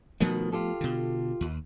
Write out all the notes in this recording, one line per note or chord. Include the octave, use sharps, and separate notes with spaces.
B2 D#3 F3 A3 B3
F4 G4 A4
B2 D3
D#2